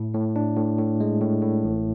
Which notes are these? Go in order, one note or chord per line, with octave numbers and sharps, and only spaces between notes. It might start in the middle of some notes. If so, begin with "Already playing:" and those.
Already playing: A2
A2
D4
A2
A2
G#3
A2
A2
A1